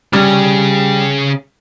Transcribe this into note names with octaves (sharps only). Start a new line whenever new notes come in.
C#3 G3 G#4